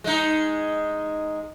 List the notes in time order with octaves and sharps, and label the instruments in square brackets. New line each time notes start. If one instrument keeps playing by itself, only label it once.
[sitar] G#3 D#4